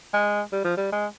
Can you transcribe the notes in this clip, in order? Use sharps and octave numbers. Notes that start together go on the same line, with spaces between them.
G#3
G3
F3
G3
G#3